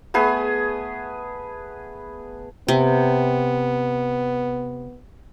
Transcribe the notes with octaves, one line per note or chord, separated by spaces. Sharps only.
A3 B3 G#4 B4
C3 B3